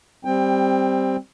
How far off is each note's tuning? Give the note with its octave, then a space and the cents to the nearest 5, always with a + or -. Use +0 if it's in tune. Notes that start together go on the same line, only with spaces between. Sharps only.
G3 +0 C4 +0 G5 +25